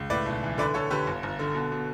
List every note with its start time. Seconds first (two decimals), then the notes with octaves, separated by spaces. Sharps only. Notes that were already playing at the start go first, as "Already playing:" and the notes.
Already playing: C#2
0.10 A2 B4 D5
0.26 B1
0.43 E3
0.58 D3 B4 D5
0.74 D3 A4 C#5
0.90 D3 G4 B4
1.07 G1
1.23 G1
1.39 D3
1.54 B2
1.72 B2